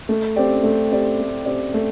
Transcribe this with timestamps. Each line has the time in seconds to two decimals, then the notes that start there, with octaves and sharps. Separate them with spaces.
0.09 A3
0.36 C4 G4 D5
0.63 A3
0.91 C4 G4 D5
1.19 A3
1.45 C4 G4 D5
1.74 A3